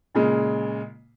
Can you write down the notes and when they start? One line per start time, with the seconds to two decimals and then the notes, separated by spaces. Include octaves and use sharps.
0.15 A#2 C#3 G#3